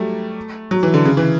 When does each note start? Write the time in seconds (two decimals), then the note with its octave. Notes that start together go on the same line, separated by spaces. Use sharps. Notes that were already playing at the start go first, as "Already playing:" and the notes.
Already playing: F#3 G3 A3
0.71 F#3
0.83 E3
0.94 D3
1.05 C#3
1.17 E3